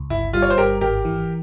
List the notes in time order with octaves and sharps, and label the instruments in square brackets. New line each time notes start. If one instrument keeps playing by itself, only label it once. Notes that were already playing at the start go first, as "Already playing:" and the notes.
Already playing: [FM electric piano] C#2
[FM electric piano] G1 [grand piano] E4
[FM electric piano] G3 [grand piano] F4
[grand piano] C#5
C5
[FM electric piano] G1 [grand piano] G4 A#4
[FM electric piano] G#1 [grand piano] G4 A#4
[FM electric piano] E3